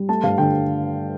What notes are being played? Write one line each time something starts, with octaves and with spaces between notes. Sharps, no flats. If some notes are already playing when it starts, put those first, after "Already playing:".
Already playing: G3
A3 A5
G2 F5
D3 G5